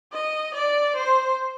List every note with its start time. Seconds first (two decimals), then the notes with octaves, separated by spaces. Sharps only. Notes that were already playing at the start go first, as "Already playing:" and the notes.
0.13 D#5
0.54 D5
0.96 C5